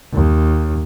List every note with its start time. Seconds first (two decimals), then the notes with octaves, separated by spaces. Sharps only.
0.13 D#2